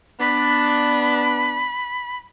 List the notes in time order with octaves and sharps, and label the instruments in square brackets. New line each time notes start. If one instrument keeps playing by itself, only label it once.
[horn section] B3 D4 [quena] B5